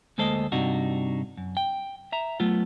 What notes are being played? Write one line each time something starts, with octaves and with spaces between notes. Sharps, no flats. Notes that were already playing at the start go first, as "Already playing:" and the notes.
D2 G#3 A#3 A4 C5 D#5
G2 C3 D4 D#4 F#4
F#2
G5
E5 A#5
F#3 A3 B3 F4